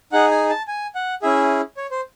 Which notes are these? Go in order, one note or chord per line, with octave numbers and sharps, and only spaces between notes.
D#4 G#4 F#5
G#5
A5
G#5
F#5
C#4 E4 G#4 E5
C#5
C5